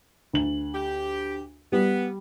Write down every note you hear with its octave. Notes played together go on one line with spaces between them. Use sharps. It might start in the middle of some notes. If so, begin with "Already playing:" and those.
D2 F#7
G4
G3 B3